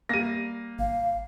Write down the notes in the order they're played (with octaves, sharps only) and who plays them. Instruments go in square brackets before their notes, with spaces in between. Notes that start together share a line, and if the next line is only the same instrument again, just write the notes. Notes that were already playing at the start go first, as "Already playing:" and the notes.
[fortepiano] G3 A#3 [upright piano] A#6 D#7
[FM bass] G#1 [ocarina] F5